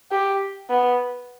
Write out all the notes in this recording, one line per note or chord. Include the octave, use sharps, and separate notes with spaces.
G4
B3